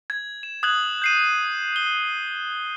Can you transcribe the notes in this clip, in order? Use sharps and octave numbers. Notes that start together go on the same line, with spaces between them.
G#6
E7
D#6 F#6 G#6 F#7
G6 C7 D#7
G7